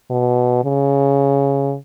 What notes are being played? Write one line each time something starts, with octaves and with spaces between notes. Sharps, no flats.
B2
C#3